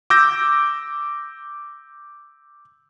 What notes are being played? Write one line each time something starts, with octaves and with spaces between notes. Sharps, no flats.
D6 E6 G6 A#6